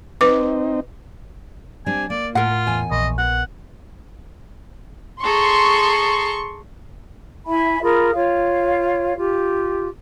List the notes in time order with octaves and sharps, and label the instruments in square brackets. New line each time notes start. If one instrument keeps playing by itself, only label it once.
[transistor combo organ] C4 D#4 [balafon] B4 D6
[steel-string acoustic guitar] G3 C4 D4 [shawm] G#5
[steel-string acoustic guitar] A#3 [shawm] D5
[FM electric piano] A2 [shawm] F4 [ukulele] A#4 F#5
[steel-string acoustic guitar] E2 G#5
[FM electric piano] A#1 [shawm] D#5
[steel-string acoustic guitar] B3 [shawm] F#5
[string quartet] G#4 A4 A#5 [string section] C6 C#6
[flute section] E4 E5 G#5 B5
F4 G#4 A#4 B5
F4 C#5 F5
F4 G4